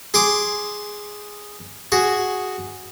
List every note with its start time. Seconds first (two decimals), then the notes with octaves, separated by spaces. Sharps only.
0.14 G#4 C6 D6 D#6
1.92 F#4 G#4